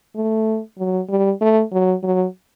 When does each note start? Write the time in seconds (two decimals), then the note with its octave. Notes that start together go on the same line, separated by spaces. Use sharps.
0.16 A3
0.78 F#3
1.09 G3
1.41 A3
1.72 F#3
2.03 F#3